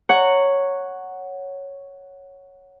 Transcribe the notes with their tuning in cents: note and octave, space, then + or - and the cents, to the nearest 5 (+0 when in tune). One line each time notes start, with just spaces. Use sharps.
C#5 +0 F#5 +0 A#5 -20